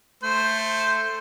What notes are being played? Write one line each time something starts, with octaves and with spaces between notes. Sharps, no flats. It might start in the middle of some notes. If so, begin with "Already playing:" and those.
A3 C5